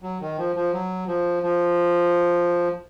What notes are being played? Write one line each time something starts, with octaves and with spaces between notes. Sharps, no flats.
F#3
D#3
F3
F3
F#3
F3
F3